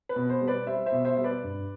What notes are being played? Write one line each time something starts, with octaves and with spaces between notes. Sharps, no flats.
B4
B2
C5
G3
B4 D5
G3 C5 E5
C5 E5
B2
C5 E5
G3 E5
B4 D5
G2